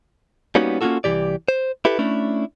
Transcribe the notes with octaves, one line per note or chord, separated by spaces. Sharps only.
G3 A#3 B3 C#4 D#4 F#4
A#3 C#4 D#4 F4 F#4 A4
C2 C3 E3 G4 D5
C5
E4 G4 A4 B4
A3 C#4 D4 E4